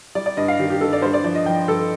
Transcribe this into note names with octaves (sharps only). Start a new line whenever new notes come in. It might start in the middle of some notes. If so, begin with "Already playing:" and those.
G3 D5
D5
G2 D#5
F5
D#3 G4
G4
G2 A4
D5
G2 C5
D5
F3 D5
D#5
F3 G5
G2 A4